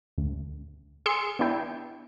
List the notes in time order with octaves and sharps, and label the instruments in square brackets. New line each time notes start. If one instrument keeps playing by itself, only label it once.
[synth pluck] D2
G#4 C6 E6 C#7
B3 D4 E4 G5